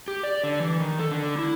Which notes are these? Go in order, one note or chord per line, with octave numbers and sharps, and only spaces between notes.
G4
D5
D3
E3
D#3
A4
D3
E4